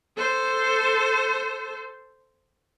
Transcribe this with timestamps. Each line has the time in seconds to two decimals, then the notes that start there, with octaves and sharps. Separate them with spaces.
0.17 A4 C5